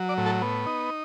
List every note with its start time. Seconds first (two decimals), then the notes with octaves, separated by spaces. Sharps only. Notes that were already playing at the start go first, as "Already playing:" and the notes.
Already playing: F#3
0.09 D5
0.18 A2
0.26 A4
0.42 B3
0.66 D#4